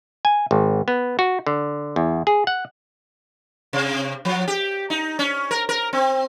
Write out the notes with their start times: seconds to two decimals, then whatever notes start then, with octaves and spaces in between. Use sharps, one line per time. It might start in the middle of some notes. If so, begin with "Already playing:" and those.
0.25 G#5
0.51 G#1
0.88 B3
1.19 F#4
1.47 D3
1.96 E2
2.27 G#4
2.47 F#5
3.73 C3
4.25 F3
4.48 G4
4.90 D#4
5.19 C#4
5.51 A#4
5.69 A#4
5.93 C4